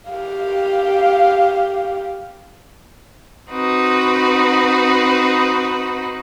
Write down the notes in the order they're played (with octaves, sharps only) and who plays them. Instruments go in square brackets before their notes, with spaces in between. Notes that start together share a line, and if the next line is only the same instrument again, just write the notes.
[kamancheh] G4 F5
[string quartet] C4 D#4 F#4 B4